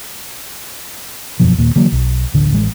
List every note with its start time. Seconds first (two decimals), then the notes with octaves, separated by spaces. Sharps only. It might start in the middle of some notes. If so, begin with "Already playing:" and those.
1.40 E1 F#2 B2 F3
1.58 D#2 A#2
1.76 D3 E3 F#3 A#3
1.92 B1
2.34 D1 A1 D3
2.51 A1 G#3